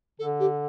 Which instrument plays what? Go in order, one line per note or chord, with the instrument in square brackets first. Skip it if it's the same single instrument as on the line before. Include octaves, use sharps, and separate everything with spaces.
[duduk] D3 [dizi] A4
[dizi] G4